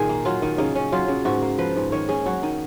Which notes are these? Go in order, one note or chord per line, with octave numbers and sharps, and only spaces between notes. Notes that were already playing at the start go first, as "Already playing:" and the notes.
Already playing: A#2 D#3 G#4
A#3
F#3 F4
D#3
C#3 D#4
C#4
F#3 F4
C#3
G#2 F#4
A#3
F3 B4
G#2
D#3 C#5
C#4 G#4
F#3 F#4
D#3 D#4